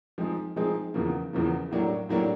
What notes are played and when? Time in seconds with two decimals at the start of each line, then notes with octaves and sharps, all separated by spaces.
0.18 F3 G#3 C4 D#4 G#4
0.56 F3 G#3 C4 D#4 G#4
0.94 E2 C#3 F3 A#3
1.33 E2 C#3 F3 A#3
1.71 A2 F#3 A#3 D4 G4
2.09 A2 F#3 A#3 D4 G4